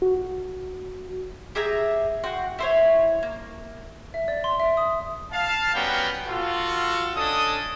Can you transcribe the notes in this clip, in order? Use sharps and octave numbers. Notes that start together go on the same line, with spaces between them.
F#4
G4 G#4 E5 A#5
F#4 F#5 G5 C6
E4 C5 C#5
A#3
E5
D5
C6
E5
D#6
F5 A5
G3 B3 C#4 F#4 A#4 G5
F4 F#4 A4
C#4 D4 A4 D#5 D#6